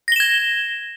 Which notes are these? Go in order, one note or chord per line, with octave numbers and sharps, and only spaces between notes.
G#6 A#6 E7 G7